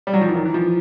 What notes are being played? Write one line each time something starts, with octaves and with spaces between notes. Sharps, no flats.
G3
F#3
F3
E3
D#3
E3
F3